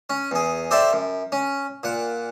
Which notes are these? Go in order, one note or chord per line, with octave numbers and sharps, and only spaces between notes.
C#4
E2 G#4
G4 A4 C5 D5 E5 G5
F#2
C#4
A#2 F#5